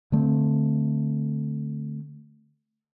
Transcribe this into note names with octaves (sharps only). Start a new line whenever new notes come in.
D3 A3 B3 C4